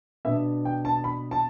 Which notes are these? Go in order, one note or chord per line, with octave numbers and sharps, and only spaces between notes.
B2 B3 D4 E5
G5
A5
B5
A5